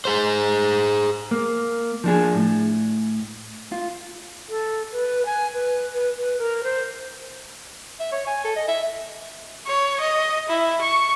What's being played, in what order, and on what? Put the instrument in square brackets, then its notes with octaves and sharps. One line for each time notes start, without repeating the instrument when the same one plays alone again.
[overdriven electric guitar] G#4 C5
[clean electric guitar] A#3
F3 D4 G#4
A2
F4
[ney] A4
B4
G#5
B4
B4
B4
A#4
C5
[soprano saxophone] E5
C#5
G#5
A4
D#5
E5
[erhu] C#5
D#5
E4
C#6